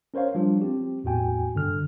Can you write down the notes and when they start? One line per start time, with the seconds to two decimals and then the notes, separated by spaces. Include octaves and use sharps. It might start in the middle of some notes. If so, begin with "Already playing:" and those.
0.14 C#4 A#4 C5 C#5 F5
0.35 F3 G3 D4 F4
0.62 C4 G4
1.04 E2 A2 F#4 G5 G#5
1.55 G2 D3 F6